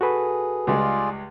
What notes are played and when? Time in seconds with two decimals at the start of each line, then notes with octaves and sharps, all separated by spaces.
0.01 F#4 G#4 A4 B4
0.67 C#2 G3 G#3 F4 G#4 D5